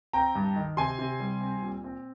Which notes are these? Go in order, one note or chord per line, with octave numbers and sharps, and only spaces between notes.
C4 G5 A#5
G2
D#3
C3 G#5 C6
C3
G3
C4
A#2
C4